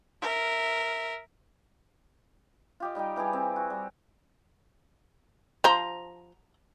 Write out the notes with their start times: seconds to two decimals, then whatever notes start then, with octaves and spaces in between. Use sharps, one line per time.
0.22 A#4 E5
2.80 F4 G4 D#5
2.95 G3 D#4 D#5 G5
3.16 E3 G3 G4 G#4
3.33 C4
3.56 F#4
3.70 G3
5.64 F3 C5 A#5